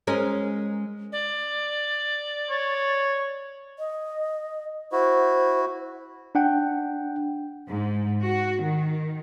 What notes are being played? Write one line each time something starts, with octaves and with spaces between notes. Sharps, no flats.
G#3 C#4 A#4
D5
C#5
D#5
E4 F#4 C5
D4 F#5 G5
G#2
F#4
D#3